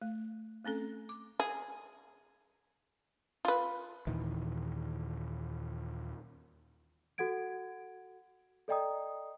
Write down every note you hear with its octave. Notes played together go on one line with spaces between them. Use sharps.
A3
A3 C4 C#4 A4
D6
G#4
F4 B4
D#2 A#2 D#3 E3
F#4 A4 F#5 G#6 D7
A4 D5 D#5 G5 A#5 D#6